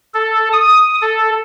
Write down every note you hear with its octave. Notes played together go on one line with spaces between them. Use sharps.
A4
D#6
A4